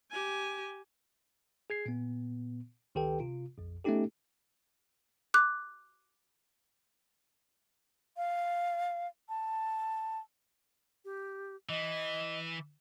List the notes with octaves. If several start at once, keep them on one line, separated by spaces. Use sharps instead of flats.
G4 G#5
G#4 G#6 C7
A#2 B3
C#2 D#3 G4 A4 B4 G5
C3 F4
A#1 F2
A3 B3 C#4 D#4 G4 A4
D6 F#6
F5
A5
G4
E3 D#5